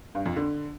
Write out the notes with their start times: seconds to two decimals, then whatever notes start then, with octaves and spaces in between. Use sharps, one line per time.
0.15 G2
0.26 F2
0.36 D3